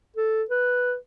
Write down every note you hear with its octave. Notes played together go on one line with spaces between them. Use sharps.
A4
B4